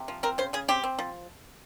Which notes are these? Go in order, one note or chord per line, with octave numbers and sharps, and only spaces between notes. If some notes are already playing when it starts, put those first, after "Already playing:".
Already playing: C3
F3
C4 A#4
C#3 C5
C#3 G#4
C4 G4
C4
F3